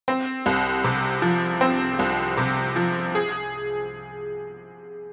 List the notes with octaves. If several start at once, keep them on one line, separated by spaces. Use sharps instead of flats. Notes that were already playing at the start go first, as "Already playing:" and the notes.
C4
C2
C3
F3
C4
C2
C3
F3
G#4